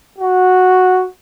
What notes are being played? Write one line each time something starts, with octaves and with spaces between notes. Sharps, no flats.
F#4